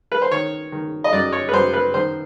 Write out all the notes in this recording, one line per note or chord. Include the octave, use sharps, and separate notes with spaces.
B4
C5
D#3 C#5
D#3
D#5
F#2 D5
C#5
B4
F#2 C5
B4
D#3 C5